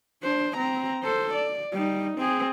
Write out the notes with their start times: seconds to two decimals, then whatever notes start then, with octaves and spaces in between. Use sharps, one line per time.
0.23 D4 C5
0.57 C4 A#5
1.03 A4 C5
1.34 D5
1.72 G3 D#4
2.18 C4 G#4